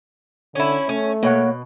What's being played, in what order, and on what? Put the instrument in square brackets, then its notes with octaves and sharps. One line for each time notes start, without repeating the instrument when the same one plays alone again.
[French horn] D3 [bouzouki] C#4 E4
[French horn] A3 [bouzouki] C#4
[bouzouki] B2 [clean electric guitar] A#3 C#5 F#5